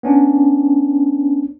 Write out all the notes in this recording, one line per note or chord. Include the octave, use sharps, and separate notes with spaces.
B3 C#4 D4